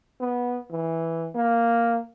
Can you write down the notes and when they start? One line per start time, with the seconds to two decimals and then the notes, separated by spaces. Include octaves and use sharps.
0.21 B3
0.71 E3
1.35 A#3